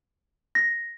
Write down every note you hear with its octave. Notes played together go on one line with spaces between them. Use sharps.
A#6